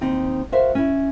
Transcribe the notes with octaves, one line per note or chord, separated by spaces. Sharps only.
D#2 C4 D#4
F#4 A#4 C5 E5 F5
C#4 E4